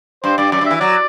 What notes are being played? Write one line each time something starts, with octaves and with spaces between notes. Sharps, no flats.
G2 C5
G2 D5
F#2 D5
G2 E5
E3
E5
F#3 D5